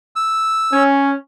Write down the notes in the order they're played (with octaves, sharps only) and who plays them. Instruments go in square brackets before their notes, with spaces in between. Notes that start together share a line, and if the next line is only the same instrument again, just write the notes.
[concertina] E6
[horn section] C#4